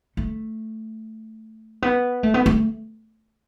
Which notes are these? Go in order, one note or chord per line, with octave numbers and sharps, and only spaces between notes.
A3
B3
A3
B3
A3